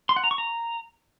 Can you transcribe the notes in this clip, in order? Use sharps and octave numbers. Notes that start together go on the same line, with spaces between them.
C6
F#5
A#5
C#6
A#5